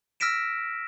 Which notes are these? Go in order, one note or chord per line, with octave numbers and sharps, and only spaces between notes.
E6 F6 A#6 B6 D7 E7